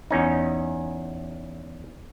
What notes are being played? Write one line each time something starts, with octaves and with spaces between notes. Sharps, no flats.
E2 C#4 D#4